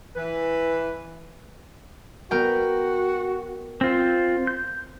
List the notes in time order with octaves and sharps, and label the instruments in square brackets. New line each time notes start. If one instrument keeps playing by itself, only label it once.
[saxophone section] E3 B4
[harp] B3 A#4 G5 [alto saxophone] F#4
[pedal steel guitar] C4 F4 [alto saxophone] C5
[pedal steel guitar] G6